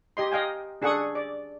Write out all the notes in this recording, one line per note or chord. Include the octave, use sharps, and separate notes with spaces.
G4 D#5 C6
D#5 F5 G5 G#5
D4 G#4 A4 F#5 C#6 D#6
D5